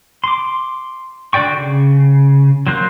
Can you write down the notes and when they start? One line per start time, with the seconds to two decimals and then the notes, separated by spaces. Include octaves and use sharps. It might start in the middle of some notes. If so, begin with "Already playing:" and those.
0.24 C6 D6
1.33 D3 F#4 D5 G5 C#6
1.57 C#3
2.67 F#3 A#3 C5 F#6